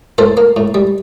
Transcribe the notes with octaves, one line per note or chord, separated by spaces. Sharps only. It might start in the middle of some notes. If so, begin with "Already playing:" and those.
A2 A4 C5
A#3
A2
G3